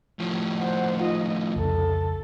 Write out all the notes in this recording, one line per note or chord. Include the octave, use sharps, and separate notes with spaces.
A2 F3
C5 F#5
D#4 F4 D#5
C2 F2 C#3 A4